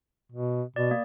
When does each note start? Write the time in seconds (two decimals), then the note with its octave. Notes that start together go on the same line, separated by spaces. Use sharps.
0.32 B2
0.76 B2 D5
0.91 A#3